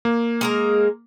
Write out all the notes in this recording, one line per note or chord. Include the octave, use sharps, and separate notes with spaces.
A#3
G#3 A#4 A#5